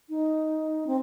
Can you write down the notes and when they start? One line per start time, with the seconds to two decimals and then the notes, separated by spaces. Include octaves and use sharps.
0.09 D#4
0.87 C4